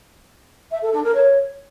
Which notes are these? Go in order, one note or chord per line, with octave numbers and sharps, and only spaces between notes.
E5
A4
D4
A#4
C#5